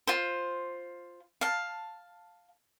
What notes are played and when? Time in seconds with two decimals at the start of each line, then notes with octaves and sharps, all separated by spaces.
0.07 F4 C5
1.41 F5 A5